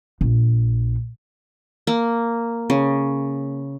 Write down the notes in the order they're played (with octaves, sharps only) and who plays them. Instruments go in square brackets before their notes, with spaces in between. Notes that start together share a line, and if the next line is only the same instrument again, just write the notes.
[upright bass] A#1
[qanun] A#3
C#3